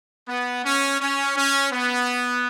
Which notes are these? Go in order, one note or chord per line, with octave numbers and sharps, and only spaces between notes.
B3
C#4
C#4
C#4
B3